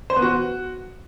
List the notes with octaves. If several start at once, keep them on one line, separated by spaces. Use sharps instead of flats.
C5
B3
F#4